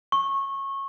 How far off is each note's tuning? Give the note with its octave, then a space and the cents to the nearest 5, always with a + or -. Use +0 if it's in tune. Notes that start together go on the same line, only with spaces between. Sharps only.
C#6 -20